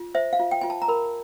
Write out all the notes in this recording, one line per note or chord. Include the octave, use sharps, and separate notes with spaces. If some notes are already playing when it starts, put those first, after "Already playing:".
Already playing: F4
C5 E5
F5
F4
G5
F4 G#5
A5
A#5
A#4 B5